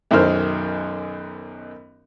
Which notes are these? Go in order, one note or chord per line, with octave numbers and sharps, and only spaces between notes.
B1 F#2 D#3 C#4 C5 F6